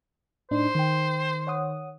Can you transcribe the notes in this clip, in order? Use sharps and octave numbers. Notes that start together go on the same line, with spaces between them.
A2 D4 D#4 C5
D#3 G5 C6
C#5 F#5 D#6